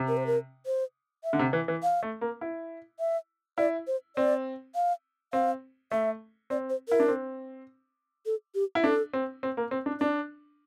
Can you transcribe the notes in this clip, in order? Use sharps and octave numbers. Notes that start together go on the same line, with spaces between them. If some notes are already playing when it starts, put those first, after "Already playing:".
Already playing: C3
A#4
C5
A#4
C5
E5
D3
C3
E3
E3
F5
A3
A#3
E4
E5
E4 D5
C5
C4 D5
F5
C4 F5
A3 E5
C4 D5
C5
E4 A#4
D4
C4
A4
G4
E4
D4 A4
C4
C4
A#3
C4
D4
D4 D5